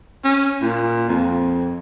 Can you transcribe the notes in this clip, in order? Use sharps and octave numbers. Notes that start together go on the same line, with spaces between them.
C#4
A#2
F2